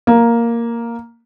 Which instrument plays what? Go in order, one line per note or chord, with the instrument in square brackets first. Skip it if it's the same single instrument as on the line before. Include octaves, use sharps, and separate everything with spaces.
[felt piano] A#3